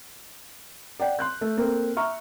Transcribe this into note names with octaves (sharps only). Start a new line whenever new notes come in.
D5 F#5 G5
C6 F#6 G6
A3
A#3 C4 A4
E5 A#5 C#6 F6